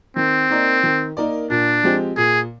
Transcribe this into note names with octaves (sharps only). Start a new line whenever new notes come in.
D#3 C4
A#3 D#4 A#4 D5
D#3
A#3 D#4 A#4 D5
A#2 D4
F3 G#3 C4 G4
A#2 G#4